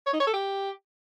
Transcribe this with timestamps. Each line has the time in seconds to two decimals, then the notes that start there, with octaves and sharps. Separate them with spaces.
0.06 C#5
0.13 D#4
0.20 C#5
0.27 A4
0.33 G4